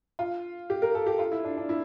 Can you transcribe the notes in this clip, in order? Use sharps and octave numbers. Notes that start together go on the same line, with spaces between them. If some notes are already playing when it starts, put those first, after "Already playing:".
F4
G4
A#4
A4
G4
F4
E4
D4
D4
E4